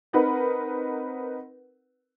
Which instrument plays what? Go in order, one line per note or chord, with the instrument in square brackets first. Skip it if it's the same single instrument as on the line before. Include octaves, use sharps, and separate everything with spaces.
[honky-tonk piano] C4 D#4 A#4 B4 F#5